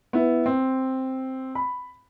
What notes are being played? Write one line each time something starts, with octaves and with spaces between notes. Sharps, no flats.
B3 E4
C4
B5